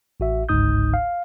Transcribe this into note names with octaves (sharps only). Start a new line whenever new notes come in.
A1 F#4 E5
G1 C#2 G#2 D#4 D#6 G6
F5